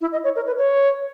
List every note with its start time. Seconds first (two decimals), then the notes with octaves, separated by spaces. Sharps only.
0.01 E4
0.12 D#5
0.24 C#5
0.36 A#4
0.46 B4
0.58 C#5